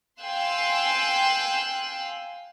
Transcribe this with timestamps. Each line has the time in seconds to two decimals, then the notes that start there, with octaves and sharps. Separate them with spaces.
0.21 F5 G5 G#5 C6 E6 F#6